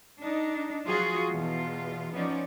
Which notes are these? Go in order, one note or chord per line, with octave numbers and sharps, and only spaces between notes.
D4 D#4
F3 F#3 F4 F#4 G#4
E2 B2 F4
F3 B3 C#4 D#4 D5